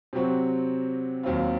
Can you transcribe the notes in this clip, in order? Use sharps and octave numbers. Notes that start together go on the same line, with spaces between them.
C3 F#3 C4 F#4
D#2 D#3 F#3 C4 F4